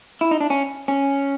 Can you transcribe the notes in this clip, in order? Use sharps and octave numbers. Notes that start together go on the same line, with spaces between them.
E4
D#4
D4
C#4
C#4